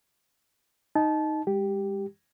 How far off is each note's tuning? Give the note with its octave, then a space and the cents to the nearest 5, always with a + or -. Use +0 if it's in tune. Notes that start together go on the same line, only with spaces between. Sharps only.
D#4 +0 A5 -25
G#3 -40 G4 +0